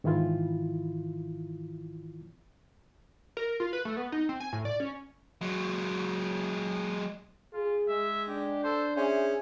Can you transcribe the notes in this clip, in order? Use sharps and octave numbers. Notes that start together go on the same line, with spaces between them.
G#2 D#3 E3 E4 F4
A#4
F4
B4
A3
B3
D#4
C4
G#5
A2
D5
C#4
F#3 G#3
F4 G#4
G#3 E5
D4 G4
A4 C5
C#4 G#4 C5 E5